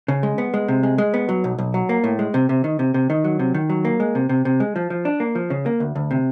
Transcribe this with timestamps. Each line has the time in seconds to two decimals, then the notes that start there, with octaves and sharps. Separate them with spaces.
0.08 C#3
0.23 G#3
0.38 B3
0.54 G#3
0.68 C3
0.83 G#3
0.98 G#3
1.14 B3
1.29 F#3
1.44 B1
1.59 B1
1.74 F#3
1.89 A#3
2.04 A2
2.19 G#3
2.34 C3
2.49 C3
2.64 D#3
2.79 C3
2.94 C3
3.10 D#3
3.24 F#3
3.39 C3
3.54 D#3
3.70 F#3
3.85 A#3
4.00 G#3
4.15 C3
4.29 C3
4.45 C3
4.60 G#3
4.76 F3
4.90 F3
5.05 D4
5.20 A#3
5.35 F3
5.50 C#3
5.66 A#3
5.80 D2
5.95 D2
6.11 C3